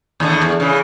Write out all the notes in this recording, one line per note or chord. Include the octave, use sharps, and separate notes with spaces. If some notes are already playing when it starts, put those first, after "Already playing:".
D#2 A2 D3
E2
C#3 E3